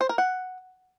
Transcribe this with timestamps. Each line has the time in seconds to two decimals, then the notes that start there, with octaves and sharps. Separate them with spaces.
0.01 C5
0.09 A#4
0.18 F#5